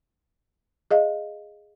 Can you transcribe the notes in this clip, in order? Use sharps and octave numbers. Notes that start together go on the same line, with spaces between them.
G#4 D#5 F5